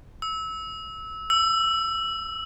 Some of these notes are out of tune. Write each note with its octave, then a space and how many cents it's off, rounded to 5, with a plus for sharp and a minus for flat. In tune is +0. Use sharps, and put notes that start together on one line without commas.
E6 -20
E6 +15